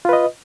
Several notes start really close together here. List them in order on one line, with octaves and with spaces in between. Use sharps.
F4 B4 D#5